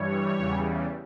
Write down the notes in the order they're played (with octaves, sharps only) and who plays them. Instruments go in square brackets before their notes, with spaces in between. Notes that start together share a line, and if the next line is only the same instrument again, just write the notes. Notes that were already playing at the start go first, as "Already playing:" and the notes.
Already playing: [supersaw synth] G2 E3 G3 C#5
E2 C#3 E3 G3